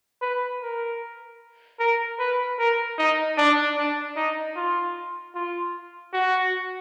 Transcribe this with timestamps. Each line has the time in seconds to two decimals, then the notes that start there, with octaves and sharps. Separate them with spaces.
0.22 B4
0.62 A#4
1.80 A#4
2.19 B4
2.59 A#4
2.98 D#4
3.38 D4
3.77 D4
4.17 D#4
4.56 F4
5.35 F4
6.14 F#4